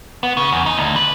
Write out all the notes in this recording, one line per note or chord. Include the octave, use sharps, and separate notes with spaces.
B3
C#3
E2
D#4
D2
B4